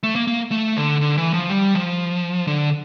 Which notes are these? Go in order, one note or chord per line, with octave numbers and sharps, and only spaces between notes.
A3
A#3
A#3
A3
D3
D3
E3
F3
G3
F3
D3